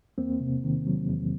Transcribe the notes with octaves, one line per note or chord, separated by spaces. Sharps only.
E2 A#3 C4
C3
D#3
F#3
E2